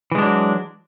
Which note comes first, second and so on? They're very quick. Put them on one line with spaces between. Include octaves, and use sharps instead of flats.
E3 G#3 D4 F#3